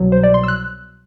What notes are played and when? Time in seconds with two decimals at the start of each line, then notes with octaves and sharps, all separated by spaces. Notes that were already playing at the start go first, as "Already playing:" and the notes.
Already playing: C2 B2 F#3
0.12 C5
0.23 D5
0.34 C6
0.43 E6
0.48 F#6